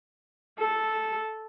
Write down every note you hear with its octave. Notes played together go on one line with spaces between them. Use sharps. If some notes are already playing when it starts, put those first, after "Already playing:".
A4